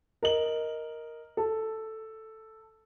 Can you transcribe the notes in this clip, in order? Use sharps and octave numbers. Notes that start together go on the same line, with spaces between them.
A#4 D#5 F#7
A4